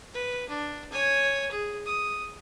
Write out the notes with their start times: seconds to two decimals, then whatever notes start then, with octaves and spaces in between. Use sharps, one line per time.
0.14 B4
0.49 D4
0.92 C#5 G#5
1.51 G#4
1.85 D#6